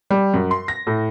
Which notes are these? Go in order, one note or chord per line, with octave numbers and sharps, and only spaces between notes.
G3
F#2
C6
A#6
A2